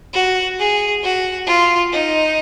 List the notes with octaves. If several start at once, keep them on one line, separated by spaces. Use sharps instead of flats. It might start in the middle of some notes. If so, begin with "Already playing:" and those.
F#4
G#4
F#4
F4
D#4